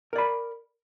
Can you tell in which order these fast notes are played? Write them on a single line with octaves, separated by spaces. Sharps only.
A#4 D5 B5